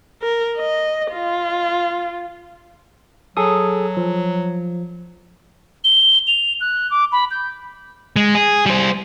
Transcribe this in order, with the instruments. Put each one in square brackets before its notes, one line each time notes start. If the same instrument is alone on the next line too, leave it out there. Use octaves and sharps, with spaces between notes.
[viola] A#4
D#5
F4
[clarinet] F#3 [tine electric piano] G#4 A4 D#6
[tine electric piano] F3
[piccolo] G7
F7
F#6
D6
B5
G6
[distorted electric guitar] G#3
G#4
G3 C5